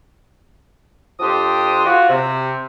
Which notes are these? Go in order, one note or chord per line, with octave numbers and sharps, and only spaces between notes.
F2 F3 D4 G4 C6 D#6
F4 F#4
C3